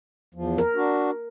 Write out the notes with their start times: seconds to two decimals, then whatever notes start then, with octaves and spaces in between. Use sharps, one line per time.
0.34 E2 F3
0.58 A#4
0.75 D4 F#4